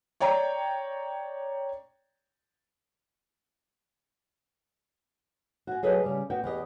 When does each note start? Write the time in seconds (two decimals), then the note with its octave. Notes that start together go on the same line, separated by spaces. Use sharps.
0.20 C#5 D5 G5 A#5
5.67 F#4 G#5
5.83 F#3 G#4 A4 B4 D#5
6.04 C#3 G3
6.30 B3 F#4 G5
6.44 E2 G4 D#5